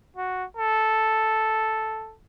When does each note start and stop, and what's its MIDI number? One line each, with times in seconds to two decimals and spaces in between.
0.17 0.44 66
0.57 2.15 69